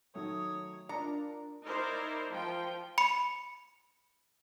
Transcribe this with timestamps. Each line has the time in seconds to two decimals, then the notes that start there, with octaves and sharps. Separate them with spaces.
0.14 D#3 F#3 A3 C#5 D#6
0.89 D4 F4 A#4 D5 A#5 C#7
1.66 D#4 E4 A#4 C5 D5
2.31 F3 G5
2.98 B5 C#7